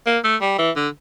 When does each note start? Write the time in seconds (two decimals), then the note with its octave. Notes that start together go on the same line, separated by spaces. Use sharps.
0.06 A#3
0.24 A3
0.41 G3
0.58 E3
0.76 D3